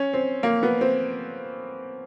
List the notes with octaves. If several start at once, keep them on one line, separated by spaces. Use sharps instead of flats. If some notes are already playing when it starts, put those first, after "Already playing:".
Already playing: C#4
C4
A#3
B3
C4